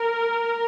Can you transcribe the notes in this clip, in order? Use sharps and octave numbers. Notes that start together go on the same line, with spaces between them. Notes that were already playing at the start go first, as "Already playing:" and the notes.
Already playing: A#4